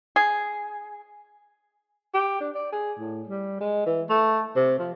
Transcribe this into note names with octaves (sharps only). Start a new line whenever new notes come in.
G#4
G4
D4
D5
G#4
A2
G3
G#3
E3
A3
C3
F3